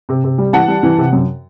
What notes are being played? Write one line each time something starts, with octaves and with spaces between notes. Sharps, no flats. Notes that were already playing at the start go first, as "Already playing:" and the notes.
C3
C3
G3
E3 F#5 A5
G3
E3
C3
F#2